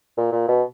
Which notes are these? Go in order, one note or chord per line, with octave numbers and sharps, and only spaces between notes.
A#2
A#2
B2